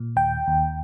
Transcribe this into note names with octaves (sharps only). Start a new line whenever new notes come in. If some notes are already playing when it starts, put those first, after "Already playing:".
Already playing: A#2
D#2 G5
D#2